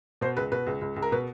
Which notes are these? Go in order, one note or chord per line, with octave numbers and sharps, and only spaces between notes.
B2 C5
C#2 B4
B2 B4
C#2
C#2
C#2
A#4
B2 B4